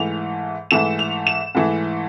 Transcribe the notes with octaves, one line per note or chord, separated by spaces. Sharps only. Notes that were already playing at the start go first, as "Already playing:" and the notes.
Already playing: G#2 E3 A3 F7
G#2 E3 A3 E7
F7
E7
G#2 E3 A3